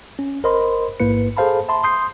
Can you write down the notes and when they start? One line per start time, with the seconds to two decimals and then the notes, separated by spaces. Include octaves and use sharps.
0.19 C#4
0.44 G1 A#4 C5 D#5 B5 C6
1.00 A1 G#2 A#3 E4 B4 C#7
1.37 G#4 A4 C5 F5 A5 B5
1.68 E5 A5 B5 C6
1.84 C6 D#6 G6 C7